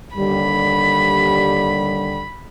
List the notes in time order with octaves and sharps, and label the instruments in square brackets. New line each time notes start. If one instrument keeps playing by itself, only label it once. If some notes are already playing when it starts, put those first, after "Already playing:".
[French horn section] D#2 D3 G3 [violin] B5